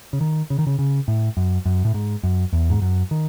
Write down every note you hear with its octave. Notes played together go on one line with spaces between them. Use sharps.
C#3
D#3
C#3
D#3
C#3
C#3
A2
F#2
F#2
A2
G#2
F#2
E2
G#2
F#2
D#3